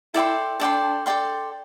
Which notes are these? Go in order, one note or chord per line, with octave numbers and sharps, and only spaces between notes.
E4 A4 D5 G5 C6
D4 A4 D5 G5 C6
A4 D5 G5 C6